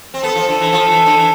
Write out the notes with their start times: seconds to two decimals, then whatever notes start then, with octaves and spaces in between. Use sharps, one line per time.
0.14 C4
0.23 B3 A4
0.36 F3
0.48 D3
0.60 E3
0.72 F3
0.90 E3
1.06 D3
1.17 E3